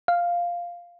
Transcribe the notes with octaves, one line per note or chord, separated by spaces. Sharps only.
F5